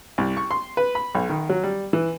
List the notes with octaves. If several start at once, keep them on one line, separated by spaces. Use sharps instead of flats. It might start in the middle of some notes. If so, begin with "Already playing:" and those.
C2
C#6
C6
B4
B5
B1
D#3
F#3
G3
E3